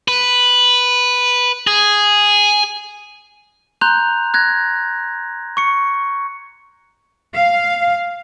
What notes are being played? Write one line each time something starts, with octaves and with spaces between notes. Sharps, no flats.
B4
G#4
A#5 C6 F#6 G6 F7
F#6 G#6 A#6
C#6 C#7
F5